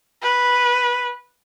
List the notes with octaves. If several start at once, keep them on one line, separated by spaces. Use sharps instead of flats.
B4